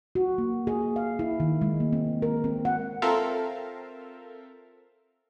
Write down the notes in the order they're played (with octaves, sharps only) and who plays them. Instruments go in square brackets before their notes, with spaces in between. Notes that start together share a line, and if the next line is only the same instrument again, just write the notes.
[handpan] F#4
A#3
G#4
F5
E4
D#3
G#3
A#3
C4
A#4
C4
F#5
[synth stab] C4 F4 A4 A#4 E5 F5